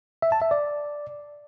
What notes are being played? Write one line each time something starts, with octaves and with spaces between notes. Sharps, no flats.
E5
A5
E5
D5